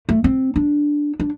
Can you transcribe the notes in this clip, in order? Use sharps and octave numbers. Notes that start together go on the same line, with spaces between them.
A3
C4
D4
D4